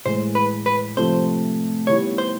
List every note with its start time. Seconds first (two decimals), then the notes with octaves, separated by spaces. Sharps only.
0.06 A2 E3 G#3 C5
0.35 B4
0.66 B4
0.97 C3 F3 A3 C4 C5
1.87 D#3 G3 B3 E4 G4 C#5
2.18 C5